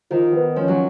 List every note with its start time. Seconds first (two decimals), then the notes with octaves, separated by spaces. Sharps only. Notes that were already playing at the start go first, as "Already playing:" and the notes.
0.10 D#3 F3
0.33 B3
0.56 F3 C#4
0.68 F#3